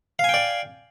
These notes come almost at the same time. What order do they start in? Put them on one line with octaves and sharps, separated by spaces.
F5 G#5 G5 D5